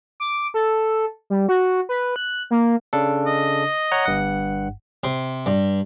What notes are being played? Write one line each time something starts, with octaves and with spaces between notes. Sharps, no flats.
D6
A4
G3
F#4
B4
F#6
A#3
C#3 D4 A4
D#5
C#5 F#5 A#5
G1 G2 F#5
C3
G2